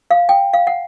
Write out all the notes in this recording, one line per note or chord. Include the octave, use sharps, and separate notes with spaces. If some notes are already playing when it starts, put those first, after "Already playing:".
F5
G5
F5
F#5